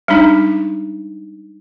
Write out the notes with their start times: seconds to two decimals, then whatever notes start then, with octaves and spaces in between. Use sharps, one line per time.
0.08 G3 G#3 D4 D#4